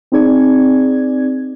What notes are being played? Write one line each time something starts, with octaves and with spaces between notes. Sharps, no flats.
C4 D#4 G#4 D5 G#6